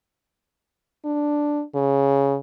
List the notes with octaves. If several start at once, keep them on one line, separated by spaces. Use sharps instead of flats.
D4
C#3